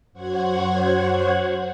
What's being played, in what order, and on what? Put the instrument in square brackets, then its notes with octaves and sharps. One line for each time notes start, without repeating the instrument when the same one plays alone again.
[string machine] F#2 F#4 C5 C#5 F#5 G#6